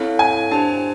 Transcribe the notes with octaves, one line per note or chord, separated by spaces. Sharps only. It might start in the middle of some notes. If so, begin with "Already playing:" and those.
Already playing: C4 E4 A4 C#5 F5
G#5
D4 G4 C5 A5